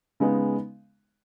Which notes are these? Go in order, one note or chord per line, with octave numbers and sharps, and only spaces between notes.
C#3 G#3 B3 D#4